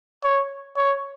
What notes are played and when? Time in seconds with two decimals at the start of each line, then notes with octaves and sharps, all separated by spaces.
0.23 C#5
0.77 C#5